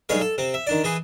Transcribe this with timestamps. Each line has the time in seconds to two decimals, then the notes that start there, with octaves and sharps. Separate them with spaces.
0.09 B1 G2 G#3 B4 C#5 F5
0.21 A4
0.38 C3 C4
0.54 E5
0.67 D#3 D4 D5
0.84 E3 G#4 B4